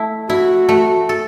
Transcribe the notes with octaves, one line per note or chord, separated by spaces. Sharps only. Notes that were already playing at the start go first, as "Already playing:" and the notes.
Already playing: A3 E4
E4 F#4
A3
A4